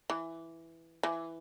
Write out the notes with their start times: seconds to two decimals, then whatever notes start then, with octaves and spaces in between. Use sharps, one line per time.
0.10 E3
1.03 E3